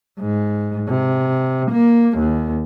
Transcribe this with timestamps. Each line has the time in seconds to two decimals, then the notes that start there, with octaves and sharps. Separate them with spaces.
0.20 G#2
0.89 C3
1.72 A#3
2.19 D#2